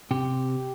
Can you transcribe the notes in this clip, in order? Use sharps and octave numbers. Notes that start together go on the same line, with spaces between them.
C3 G4